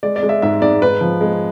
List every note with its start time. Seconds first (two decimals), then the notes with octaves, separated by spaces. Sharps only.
0.03 G#3 D5
0.16 D5
0.23 G#3
0.29 E5
0.42 G#2 E5
0.62 G#2 D5
0.82 G#2 B4
1.01 F3
1.21 G#3